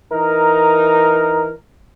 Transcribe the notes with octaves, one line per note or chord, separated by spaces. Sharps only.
E3 D#4 A#4